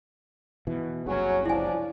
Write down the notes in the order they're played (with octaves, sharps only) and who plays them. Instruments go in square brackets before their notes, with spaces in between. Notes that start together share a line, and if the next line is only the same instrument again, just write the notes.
[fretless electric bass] B2 E3
[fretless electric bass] F#1 C2 C#3 [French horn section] F#3 C#4
[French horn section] F3 D4 D5 [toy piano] E4 G#5